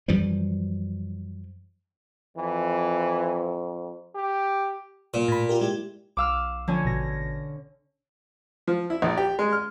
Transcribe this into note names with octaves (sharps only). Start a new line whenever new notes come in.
F#2 E3 F3 G3
F2 E3
G4
A#2
A2 B5
F4 G4 A#4
G#3 E4 G4
B1 F5 D6 E6 F6
D3 F3 C#4 G#5
A1 B2 A#6
F3
E4
A#1
G4
G#3
F6